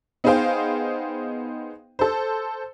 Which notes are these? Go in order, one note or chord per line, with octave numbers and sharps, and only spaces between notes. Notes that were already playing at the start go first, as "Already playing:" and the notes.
B3 D#4 G#4 C5 F5 G5
A4 C5